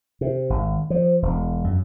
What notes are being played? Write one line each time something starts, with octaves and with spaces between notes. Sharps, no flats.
C3
G#1
F3
E1
F#2